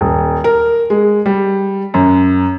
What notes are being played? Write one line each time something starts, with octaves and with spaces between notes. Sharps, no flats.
D#1
A#4
G#3
G3
F#2